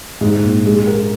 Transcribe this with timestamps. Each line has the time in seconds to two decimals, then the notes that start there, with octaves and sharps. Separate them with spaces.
0.21 G#2
0.43 A#1
0.66 G#3
0.87 A#4